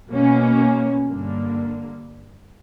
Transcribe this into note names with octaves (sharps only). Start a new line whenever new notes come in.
B2 A#3 C#4
G2 D3 A#3